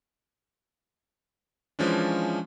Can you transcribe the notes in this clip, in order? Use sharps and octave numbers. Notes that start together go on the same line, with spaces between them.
E3 F3 G#3 C#4 D4